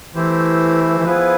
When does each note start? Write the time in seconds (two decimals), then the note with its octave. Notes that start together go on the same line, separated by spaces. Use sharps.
0.14 E3 A3 C4 E4 G4 C5
0.98 E3
1.05 F3 B3 E4 G#4 B4